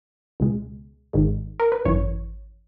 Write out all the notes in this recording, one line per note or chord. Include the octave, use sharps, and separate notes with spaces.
C#2 B2 G#3
G#1 G#2 D#3 G#3
A#4
B4
G#1 F#2 E3 C#5